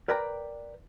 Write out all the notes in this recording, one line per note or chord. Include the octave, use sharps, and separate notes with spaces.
A#4 B4 D5 G5 A#5